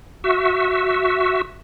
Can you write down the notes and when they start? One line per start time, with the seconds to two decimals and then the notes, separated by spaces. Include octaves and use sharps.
0.24 F#4 E5